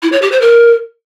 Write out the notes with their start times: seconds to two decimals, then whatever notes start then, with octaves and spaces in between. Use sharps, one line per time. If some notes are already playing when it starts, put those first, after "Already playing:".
0.03 E4
0.12 C#5
0.22 G4
0.32 C5
0.41 A#4